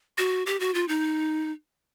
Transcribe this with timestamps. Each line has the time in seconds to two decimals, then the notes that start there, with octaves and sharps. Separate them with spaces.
0.18 F#4
0.46 G4
0.60 F#4
0.74 F4
0.88 D#4